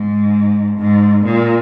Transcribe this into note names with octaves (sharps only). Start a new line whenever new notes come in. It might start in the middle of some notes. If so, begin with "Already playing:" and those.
Already playing: G#2
G#2
A#2